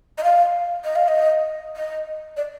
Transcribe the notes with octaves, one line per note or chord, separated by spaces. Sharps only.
D#5
F5
D#5
F5
D#5
D#5
D5